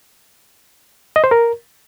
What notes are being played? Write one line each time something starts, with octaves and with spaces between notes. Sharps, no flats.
D#5
C5
A#4